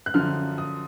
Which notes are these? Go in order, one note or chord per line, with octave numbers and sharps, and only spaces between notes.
F#6
F#2 D3 F3 F6
D#6